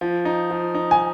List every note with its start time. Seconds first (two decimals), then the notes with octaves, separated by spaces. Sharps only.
0.01 F3
0.25 D#4
0.51 F3
0.75 D#4
0.91 G#5